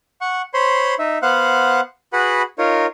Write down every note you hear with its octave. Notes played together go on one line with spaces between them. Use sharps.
F#5 C#6
C5 C#5 B5 C6
D#4 E5
B3 C5 F5 F#5 F#6
F#4 G#4 B4 F#5 B5
D#4 F4 A#4 C#5